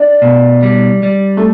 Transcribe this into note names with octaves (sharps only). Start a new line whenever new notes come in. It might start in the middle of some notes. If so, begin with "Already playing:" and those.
Already playing: D4
B2
G3
G3
A3